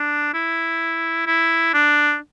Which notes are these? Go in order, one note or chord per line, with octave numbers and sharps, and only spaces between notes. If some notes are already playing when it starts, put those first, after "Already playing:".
Already playing: D4
E4
E4
D4